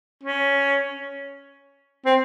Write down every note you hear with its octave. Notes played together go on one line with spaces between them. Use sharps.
C#4
C4